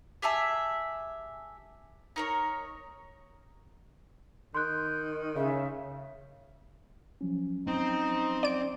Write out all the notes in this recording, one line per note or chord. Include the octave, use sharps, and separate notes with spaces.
G4 G#4 E5 A5
D#4 A#4 C#5
D#3 C6 F#6 G6
C#3 E5
F3 F#3 C#4
C4 D#4
D5 D7